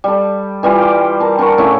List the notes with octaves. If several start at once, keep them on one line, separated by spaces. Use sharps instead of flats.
G3 A4
E3 G3 F4
G5 D6
A#4 A5
D4 A#4 F#5 C#6
A2 C#3 E4 D6